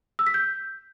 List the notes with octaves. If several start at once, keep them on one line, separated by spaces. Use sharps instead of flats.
E6
B6
G6